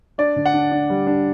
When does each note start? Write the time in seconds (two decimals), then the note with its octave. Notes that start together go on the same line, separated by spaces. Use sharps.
0.18 D4 D5
0.36 D3
0.46 F#5
0.53 D4
0.71 D4
0.90 G3
1.07 D4